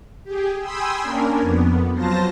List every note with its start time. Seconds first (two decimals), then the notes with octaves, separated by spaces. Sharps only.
0.24 G4 G#4
0.60 G5 G#5 B5 C6 D#6 E6
1.01 A#3 C#4 D4 A#4
1.41 F2 B3
1.93 F#3 F4 C5 A5 A#6